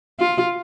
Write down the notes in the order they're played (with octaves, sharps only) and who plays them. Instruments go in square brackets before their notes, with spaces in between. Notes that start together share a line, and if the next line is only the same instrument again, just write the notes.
[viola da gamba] F4